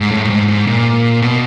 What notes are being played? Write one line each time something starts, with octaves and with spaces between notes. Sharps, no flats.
G#2
A2
A2
G#2
G#2
A#2
B2